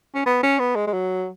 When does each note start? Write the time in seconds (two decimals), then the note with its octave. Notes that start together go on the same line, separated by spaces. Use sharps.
0.15 C#4
0.26 B3
0.43 C#4
0.59 B3
0.76 G#3
0.87 G#3
0.93 F#3